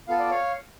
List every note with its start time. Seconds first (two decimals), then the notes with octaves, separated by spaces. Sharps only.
0.08 B3 F4 A4 F5
0.19 D5
0.31 C#5 F5